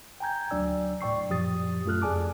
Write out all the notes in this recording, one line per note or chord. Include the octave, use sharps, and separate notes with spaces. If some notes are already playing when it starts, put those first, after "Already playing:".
G5 G#5 A#5 G6 G#6
D2 F#3 D4 D5 E6
A2 D5 G5 C#6 C7
F#2 A#2 F3 G4 D#6 A6
F#2 A3 F4 A4 F6 F#6
F2 G#4 D5 G#5 A5 D6